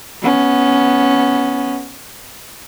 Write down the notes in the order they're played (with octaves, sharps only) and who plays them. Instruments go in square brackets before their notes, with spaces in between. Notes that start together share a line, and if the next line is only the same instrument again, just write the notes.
[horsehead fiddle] B3 C#4